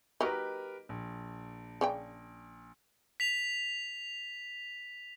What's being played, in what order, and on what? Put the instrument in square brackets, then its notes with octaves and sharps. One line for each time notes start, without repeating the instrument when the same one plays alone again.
[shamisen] F#3 A#3 D#4 [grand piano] G4 A#4 B4
[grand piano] A#1
[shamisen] C#3 D5 G5
[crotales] B6 F7